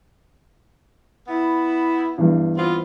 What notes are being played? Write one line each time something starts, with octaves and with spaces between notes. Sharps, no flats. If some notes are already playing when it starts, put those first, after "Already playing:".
B3 E4
E2 G2
B3 C4 F4